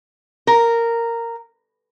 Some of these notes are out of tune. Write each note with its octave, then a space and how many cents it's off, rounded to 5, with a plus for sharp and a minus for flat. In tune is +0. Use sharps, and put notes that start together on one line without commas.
A#4 -10